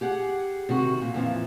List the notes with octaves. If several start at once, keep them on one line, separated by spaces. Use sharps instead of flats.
G4 G#4 F#5
C3 D#3 F#4
A#2
F2 A#2 E3 F3